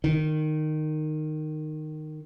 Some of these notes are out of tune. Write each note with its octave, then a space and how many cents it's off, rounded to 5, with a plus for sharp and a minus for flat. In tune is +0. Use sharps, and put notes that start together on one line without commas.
D#3 -15